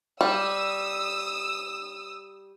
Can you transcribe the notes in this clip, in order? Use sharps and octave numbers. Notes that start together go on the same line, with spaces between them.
G3 D#6 E6